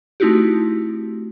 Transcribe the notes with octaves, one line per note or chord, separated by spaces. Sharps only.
A3 C4 D#4 E4 F#4 G4